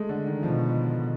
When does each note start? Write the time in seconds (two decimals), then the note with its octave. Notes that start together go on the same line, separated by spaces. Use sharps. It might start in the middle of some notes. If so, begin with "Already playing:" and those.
Already playing: G#3 A3
0.09 D3
0.27 D#3
0.43 B2 F3